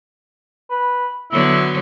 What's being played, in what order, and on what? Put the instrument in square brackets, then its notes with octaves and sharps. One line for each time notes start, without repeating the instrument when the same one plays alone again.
[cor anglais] B4
[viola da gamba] D3 F#3 B3 [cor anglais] E4